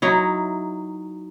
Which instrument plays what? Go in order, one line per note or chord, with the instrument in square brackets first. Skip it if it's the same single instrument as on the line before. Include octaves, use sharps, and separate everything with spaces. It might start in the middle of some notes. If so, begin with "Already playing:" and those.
[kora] F#3 D#4 E4